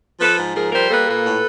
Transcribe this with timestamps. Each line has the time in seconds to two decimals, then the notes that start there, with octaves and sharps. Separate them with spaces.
0.21 F3 A4 B4
0.39 G#2
0.55 F3 G#4 A#4
0.72 G3 A#4 C5
0.90 A#3 A4 B4
1.07 A#2 A4 B4
1.25 A2